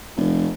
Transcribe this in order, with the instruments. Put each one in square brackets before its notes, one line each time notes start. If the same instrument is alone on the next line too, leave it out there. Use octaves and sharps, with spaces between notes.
[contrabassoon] F1